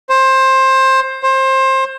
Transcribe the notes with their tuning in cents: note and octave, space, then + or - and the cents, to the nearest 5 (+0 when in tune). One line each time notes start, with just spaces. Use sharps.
C5 +20
C5 +25